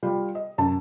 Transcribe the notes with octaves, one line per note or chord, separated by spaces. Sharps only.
G3 F4
D#5
F#2 A5